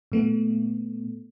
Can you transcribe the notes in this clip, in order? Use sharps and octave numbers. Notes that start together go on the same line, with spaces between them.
A#2 A3 B3